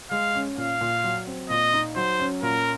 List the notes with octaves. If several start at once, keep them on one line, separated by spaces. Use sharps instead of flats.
G#3 F5
C#4
A#2 F5
A#2
F#3
C4
A#2 D#5
D#4
F#3 C5
C#4
A#2 A#4